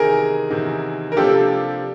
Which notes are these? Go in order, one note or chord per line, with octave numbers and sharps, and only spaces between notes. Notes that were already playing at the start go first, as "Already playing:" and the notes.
Already playing: E2 C3 D#3 G#4 A#4
E2 C3 D#3
A#4
C3 F3 A#3 D4 F4 G4 A4